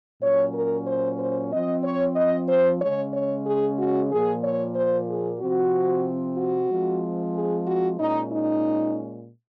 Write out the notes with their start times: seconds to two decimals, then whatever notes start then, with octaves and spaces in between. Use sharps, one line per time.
0.22 A#2 F#3 C#4 C#5
0.54 A#4
0.87 C5
1.19 C5
1.52 F3 C4 D#5
1.84 C#5
2.16 D#5
2.48 C5
2.81 C#3 G#3 C#4 C#5
3.13 C#5
3.46 G#4
3.78 F#4
4.11 A#2 F3 A#3 G#4
4.44 C#5
4.75 C5
5.08 G#4
5.40 C3 F3 C4 F#4
6.38 F#4
6.70 F3 G#3 C4
7.35 G#4
7.67 F#4
7.99 A#2 G#3 C#4 D#4
8.32 D#4